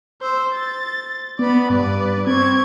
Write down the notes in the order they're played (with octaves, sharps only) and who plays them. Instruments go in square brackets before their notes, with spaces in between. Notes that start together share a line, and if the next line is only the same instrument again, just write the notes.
[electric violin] C5 E6
A6
[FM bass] B3 [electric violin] D5 B5
[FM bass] G2 [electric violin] B4 D5
[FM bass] C4 [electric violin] C#6 G#6